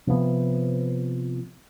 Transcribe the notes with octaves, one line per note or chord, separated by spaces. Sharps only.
C3 F3 B3